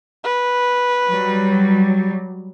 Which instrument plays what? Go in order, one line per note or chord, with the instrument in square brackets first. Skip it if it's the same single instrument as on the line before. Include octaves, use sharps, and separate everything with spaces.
[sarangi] B4
[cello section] F#3 G3